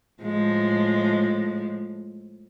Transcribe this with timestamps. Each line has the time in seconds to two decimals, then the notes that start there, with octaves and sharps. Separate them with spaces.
0.23 A2 F3 G#3